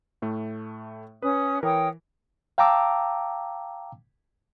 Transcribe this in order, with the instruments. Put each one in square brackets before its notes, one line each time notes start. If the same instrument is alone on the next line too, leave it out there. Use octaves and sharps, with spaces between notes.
[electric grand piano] A2 A3
[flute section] C#4 D#6 [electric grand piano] B4
[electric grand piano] E3 A#4 [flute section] C#5 G5 D#6
[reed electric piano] F5 G5 A5 A#5 D6 E6